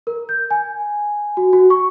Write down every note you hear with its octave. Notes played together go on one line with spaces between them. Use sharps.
A#4
G6
G#5
F#4
F#4
C#6